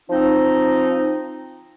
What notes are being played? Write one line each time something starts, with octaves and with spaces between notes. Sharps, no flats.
F3 C4 D#4